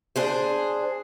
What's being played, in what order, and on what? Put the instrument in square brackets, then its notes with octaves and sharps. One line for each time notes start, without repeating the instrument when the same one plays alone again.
[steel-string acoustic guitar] D4 G#4 C5